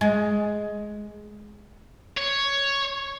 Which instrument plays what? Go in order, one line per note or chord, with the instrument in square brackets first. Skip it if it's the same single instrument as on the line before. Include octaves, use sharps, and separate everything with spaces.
[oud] G#3
[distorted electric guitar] C#5